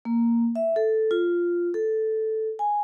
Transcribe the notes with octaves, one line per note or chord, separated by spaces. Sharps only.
A#3
E5
A4
F4
A4
G#5